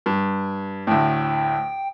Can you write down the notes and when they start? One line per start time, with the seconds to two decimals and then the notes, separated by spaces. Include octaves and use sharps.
0.06 G2
0.87 D2 A2 G5